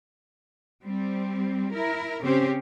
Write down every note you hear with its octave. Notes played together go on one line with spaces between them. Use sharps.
G3 C4
E4 A#4
C#3 C4 C#4 G4 C5